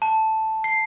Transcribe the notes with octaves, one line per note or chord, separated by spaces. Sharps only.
A5
C7